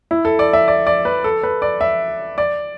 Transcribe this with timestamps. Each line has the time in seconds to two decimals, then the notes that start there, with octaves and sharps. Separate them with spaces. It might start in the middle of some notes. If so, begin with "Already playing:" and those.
0.11 E4
0.25 A4
0.39 D5
0.53 E5
0.68 D5
0.87 D5
1.05 B4
1.24 A4
1.43 B4
1.62 D5
1.81 E5
2.38 D5